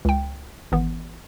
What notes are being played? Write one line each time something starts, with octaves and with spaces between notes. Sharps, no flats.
C#2 G5
G#1 E3 B3